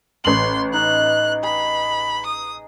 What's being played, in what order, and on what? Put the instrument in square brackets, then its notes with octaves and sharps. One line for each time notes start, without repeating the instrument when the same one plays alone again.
[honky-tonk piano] A1 F#7 [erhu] C6
[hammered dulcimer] D#4 [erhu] F#6
[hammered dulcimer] G#4 [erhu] B5
[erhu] D#6